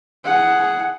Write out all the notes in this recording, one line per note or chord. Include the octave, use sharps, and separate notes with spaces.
G#4 F#5